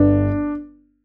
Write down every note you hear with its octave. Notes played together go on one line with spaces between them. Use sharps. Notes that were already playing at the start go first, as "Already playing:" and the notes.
Already playing: G1 G2 D4